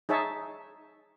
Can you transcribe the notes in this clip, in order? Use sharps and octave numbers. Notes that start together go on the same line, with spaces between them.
D#4 G#4 C#5 E5 A5